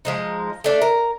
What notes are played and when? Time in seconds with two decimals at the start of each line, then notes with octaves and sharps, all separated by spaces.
0.05 F3 G#3 D#4
0.64 A3 D4 E5
0.82 A#4